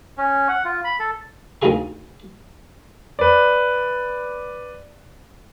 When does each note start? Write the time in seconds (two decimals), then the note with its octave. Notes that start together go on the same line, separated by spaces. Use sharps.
0.18 C#4
0.48 F#5
0.65 F4
0.84 B5
0.99 A4
1.62 D2 D#3 D#4 F4 G#4 C#6
3.19 B4 D5